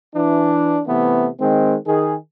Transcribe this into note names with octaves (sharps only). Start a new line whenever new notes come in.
E3 D4
C3 E3 A3 B3
D#3 G#3 C4
D#3 G#4